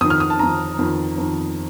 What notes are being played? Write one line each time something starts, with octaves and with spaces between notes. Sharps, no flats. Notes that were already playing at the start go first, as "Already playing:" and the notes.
F2 D#3 D#6
F6
D#6
A5
F2 D#3 A#5
F2 D#3
F2 D#3